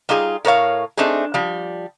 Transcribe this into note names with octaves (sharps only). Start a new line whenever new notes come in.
G3 D#4 F4 G#4
A2 A#4 C#5 F5
A3 C4 D4 D#4 G#4
F3 G3